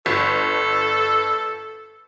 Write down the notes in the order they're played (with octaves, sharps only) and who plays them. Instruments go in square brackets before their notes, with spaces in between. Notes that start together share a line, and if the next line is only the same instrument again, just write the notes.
[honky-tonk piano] G1 [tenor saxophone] A4